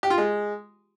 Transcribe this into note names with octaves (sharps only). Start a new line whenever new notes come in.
G4
F4
G#3